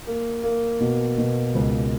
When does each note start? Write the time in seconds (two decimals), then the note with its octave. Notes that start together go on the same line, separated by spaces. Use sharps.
0.07 A#3
0.44 A#3
0.80 B2
1.18 B2
1.55 C#2